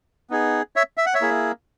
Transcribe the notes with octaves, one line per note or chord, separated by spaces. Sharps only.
B3 D#4 G#4
C#5 E5
E5
F#5
C#5 E5
A#3 E4 G#4